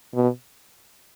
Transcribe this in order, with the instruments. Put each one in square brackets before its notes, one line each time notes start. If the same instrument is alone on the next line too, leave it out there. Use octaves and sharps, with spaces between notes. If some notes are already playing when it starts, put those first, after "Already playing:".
[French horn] B2